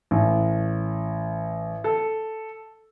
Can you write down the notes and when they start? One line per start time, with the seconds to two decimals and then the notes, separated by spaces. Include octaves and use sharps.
0.11 A1
1.84 A4